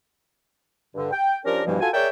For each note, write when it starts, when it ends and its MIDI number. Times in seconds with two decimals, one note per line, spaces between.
0.94 1.11 43
0.94 1.11 50
1.11 1.37 79
1.44 1.62 53
1.44 1.62 61
1.44 1.62 62
1.44 1.62 67
1.44 1.62 70
1.65 1.77 43
1.65 1.77 47
1.65 1.77 52
1.65 1.77 53
1.65 1.77 55
1.65 1.77 58
1.80 1.90 65
1.80 1.90 66
1.80 1.90 69
1.80 1.90 80
1.93 2.08 68
1.93 2.08 70
1.93 2.08 73
1.93 2.08 74
1.93 2.08 76
1.93 2.08 79